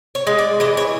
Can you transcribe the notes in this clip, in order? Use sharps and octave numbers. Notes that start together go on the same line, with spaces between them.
C#5
G#3
D5
E3 D#5
C#5